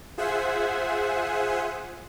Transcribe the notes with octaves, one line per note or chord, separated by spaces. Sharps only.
F4 G#4 C5 E5 F#5 G#5